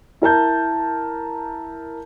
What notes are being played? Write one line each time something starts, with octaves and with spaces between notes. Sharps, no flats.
E4 A#4 A5 G6